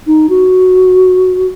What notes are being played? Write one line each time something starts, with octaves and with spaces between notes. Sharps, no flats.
D#4
F#4